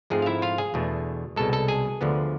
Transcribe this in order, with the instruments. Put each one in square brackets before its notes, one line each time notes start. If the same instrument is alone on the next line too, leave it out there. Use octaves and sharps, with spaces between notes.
[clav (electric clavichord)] G#2 F3 G#3 A3 C4 G#4
F5
E4 E5
F4 F5
G#4 G#5
E2 B2 A3 D4
C2 B2 G#3 A4 A5
A4 A5
G#4 G#5
D2 D3 F3 B3